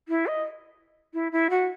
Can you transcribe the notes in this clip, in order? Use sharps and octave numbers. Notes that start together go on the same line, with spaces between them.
E4
D#5
E4
E4
F#4